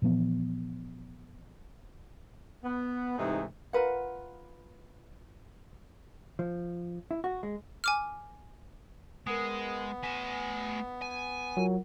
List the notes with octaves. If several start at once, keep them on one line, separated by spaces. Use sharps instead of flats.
A#2 E3 F3 B3
B3
G#2 C3 E3 A3 D#4 G#4
F4 A#4 B4 F#5
F3
E4
F#4
G#3
G#5 D6 F6
G#3 B3 A#4 D#6
A3 G#5 B6 E7
G#5
F#3 F4 A#4 F#5